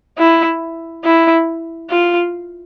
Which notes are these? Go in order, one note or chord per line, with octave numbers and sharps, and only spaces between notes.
E4
E4
F4